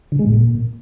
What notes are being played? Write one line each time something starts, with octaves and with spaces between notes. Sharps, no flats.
D3
G#3
A2
A#2